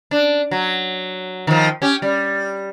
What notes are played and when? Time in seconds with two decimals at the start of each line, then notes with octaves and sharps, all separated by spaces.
0.11 D4
0.51 F#3
1.47 D#3 F3
1.82 C#4 G4
2.02 G3